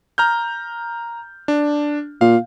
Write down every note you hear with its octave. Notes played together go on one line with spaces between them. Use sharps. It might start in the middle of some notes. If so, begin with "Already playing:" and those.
A#5 F6 G6
D4
A#2 F5